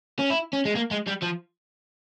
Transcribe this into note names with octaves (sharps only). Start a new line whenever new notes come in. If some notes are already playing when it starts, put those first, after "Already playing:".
C#4
E4
C#4
G#3
A#3
G#3
G3
F3